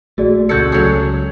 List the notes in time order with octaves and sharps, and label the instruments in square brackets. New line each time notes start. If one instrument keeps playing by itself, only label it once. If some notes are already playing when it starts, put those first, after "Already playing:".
[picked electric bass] A#1 A3 [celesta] F#4 G#4 D5
[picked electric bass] C#2 C#3 [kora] F#4 A4 [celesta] G6 G#6 C#7
[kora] F#3 G#4